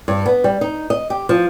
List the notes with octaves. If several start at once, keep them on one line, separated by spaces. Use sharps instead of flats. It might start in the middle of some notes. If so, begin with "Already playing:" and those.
G2
B3
G3
D#4
D#5
G4
F3